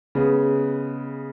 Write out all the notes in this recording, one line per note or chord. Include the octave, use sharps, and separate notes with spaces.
C#3 G#3 B3